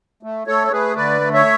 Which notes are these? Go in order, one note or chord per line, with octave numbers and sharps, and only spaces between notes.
A3
A3 A4 C#5
C#5
A3 G#4 B4
D3 B4 D5
A3
C#5 E5